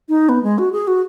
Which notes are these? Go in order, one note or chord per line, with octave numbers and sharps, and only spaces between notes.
D#4
B3
G#3
F#4
G#4
F#4